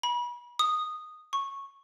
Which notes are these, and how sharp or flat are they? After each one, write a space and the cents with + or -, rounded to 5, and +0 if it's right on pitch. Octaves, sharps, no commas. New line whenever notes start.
B5 -35
D#6 -10
C#6 -10